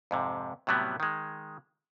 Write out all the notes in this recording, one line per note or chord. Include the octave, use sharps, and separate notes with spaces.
F2 G#2 C3
A2 C3 F#3 G3 B3
D#3 G#3